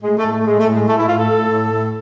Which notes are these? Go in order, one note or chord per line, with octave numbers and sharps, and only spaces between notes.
A2 G#3
A3
A2
A3
A2 G#3
A3
A2
G#3
A2 A3
E4
A2 F4
A4
A2
A2
A2